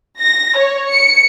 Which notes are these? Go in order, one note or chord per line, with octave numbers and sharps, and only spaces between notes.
A#6
C#5
C#7